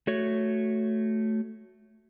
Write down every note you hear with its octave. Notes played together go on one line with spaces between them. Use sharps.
A3 F#4 C#5